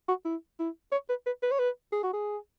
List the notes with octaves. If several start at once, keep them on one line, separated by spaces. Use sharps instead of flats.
F#4
E4
E4
C#5
B4
B4
B4
C#5
B4
G#4
F#4
G#4